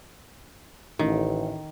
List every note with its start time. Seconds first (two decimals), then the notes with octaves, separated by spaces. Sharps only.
0.99 A1 D#3